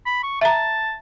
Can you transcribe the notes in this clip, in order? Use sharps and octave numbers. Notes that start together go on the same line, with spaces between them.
B5
C#6
E5 A5 A#5